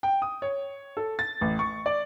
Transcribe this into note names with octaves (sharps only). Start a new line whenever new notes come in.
G5
D#6
C#5
A4
A6
A1
C#6
D5